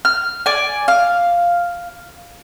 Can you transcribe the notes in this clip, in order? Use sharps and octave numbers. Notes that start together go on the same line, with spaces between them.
F6
D5 G#5
F5